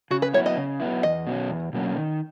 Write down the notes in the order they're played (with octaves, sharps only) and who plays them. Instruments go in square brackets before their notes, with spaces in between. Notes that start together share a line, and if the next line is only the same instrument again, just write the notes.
[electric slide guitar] C#3 [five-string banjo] F#4
[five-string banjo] B4
[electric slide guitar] F#3 B3 E4 [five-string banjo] C#5
[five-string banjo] D#5
[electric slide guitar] C#3
F#3 B3 E4
[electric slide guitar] E2 [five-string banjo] D#5
[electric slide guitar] B2 F#3 A#3 C#4
E2
B2 F#3 A#3 C#4
D#3